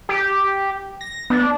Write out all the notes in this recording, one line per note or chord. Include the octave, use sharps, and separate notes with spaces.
G4
A#6
B3 D4